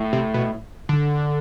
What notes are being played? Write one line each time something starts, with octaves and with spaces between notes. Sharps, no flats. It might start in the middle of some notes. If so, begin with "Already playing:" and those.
Already playing: A2
C3
B2
D3